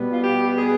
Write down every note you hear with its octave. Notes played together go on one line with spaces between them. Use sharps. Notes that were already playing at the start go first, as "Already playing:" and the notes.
Already playing: B2 G3 B3
F4
G4
G#4